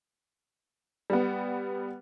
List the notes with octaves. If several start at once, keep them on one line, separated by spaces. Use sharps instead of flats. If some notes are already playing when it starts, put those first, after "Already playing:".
G3 B3